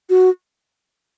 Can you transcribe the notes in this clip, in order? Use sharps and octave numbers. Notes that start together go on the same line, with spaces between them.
F#4